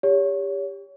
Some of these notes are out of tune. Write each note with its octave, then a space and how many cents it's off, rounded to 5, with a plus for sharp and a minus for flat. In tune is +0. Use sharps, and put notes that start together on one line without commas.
G4 +25 C#5 +30